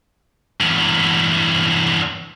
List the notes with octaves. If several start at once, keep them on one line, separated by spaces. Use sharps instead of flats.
E2 G2